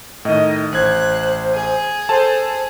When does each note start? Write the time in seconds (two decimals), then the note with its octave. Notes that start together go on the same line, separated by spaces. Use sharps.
0.25 A2 D#3 D#5
0.72 A1 C5 F#6 G#6
1.54 G#4
2.09 A4 C5 A5